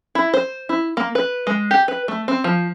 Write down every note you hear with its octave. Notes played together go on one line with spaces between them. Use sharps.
E4
C5
E4
A#3
B4
G#3
G4
B4
A3
C4
F3